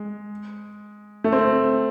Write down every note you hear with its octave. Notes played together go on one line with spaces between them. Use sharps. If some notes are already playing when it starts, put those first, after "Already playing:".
Already playing: G#3
A3
C4